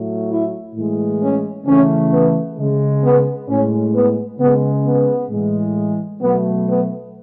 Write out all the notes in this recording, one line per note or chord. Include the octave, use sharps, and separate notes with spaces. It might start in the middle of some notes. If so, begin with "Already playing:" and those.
Already playing: A2 F#3 A3
E4
A2 E3 G#3
C#4
C#3 E3 A3 C#4
B3
C#3 G#3
B3
A2 G#3 C#4
B3
C#3 G#3 B3
B3
A2 E3 G#3
B2 F#3 A3 B3
B3